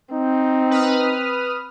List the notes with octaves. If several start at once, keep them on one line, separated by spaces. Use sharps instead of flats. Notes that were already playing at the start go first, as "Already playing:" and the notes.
C4 D#4
B4 D#6 F6